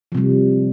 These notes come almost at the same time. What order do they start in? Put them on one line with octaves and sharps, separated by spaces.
F3 C3 G3